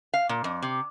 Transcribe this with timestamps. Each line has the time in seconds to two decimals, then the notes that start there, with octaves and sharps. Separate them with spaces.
0.14 F5
0.29 A#2
0.44 F2
0.62 C3